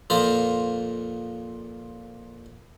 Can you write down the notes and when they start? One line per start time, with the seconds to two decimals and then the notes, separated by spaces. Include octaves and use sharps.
0.10 F2 A#2 F4 C5 A#5